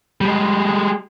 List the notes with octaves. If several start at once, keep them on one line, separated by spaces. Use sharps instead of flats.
G3 G#3